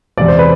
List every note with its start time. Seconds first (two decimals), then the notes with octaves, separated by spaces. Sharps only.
0.17 E2 C3 G#3 D5
0.28 C5
0.39 B4